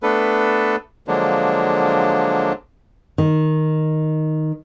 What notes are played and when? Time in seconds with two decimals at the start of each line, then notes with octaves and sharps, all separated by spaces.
0.03 A3 B3 D4 A4 B4
1.07 D3 F3 F#3 G#3 A#3 D4
3.18 D#3